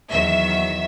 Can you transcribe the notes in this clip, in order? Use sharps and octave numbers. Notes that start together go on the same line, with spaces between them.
E2 D#3 F#3 E5